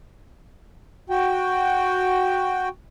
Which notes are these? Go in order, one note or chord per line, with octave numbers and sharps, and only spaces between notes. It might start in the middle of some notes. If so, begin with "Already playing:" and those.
F#4 G5